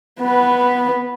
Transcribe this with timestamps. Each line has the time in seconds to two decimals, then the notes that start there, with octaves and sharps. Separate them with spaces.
0.20 B3 B4